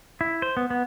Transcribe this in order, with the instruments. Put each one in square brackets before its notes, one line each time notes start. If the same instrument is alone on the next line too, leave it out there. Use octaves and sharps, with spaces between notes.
[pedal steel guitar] E4
C5
B3
B3